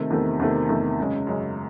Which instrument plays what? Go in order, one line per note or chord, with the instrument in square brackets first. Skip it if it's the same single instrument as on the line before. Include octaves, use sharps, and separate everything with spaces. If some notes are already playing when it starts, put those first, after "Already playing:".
Already playing: [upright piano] C3 D#3 A3
E2 C3 D#3 A3
E2 C3 D#3 A3
E2 C3 D#3 A3
F#2 C#3 G#3
F#2 C#3 G#3